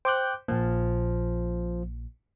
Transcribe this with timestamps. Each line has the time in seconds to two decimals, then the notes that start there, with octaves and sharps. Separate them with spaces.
0.05 C5 G5 D6 F#6 G6
0.48 A#1 A#2 F3